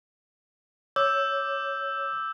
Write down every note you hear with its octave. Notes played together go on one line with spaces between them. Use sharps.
C#5 D6 E6 G6